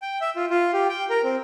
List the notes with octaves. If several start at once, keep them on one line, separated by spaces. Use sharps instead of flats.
G5
E5
F4
F4
G4
G5
A#4
C4